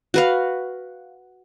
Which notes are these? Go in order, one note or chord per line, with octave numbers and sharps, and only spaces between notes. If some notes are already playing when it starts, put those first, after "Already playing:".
F#4 B4 F5